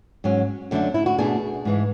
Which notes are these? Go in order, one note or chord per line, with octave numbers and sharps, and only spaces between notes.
G#2 F#3 C#4
F#2 D3 A3 D4
E4
F#4
B2 A3 D4 G#4
G#2 E3 G#3